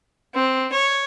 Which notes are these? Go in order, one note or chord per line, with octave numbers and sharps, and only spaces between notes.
C4
C#5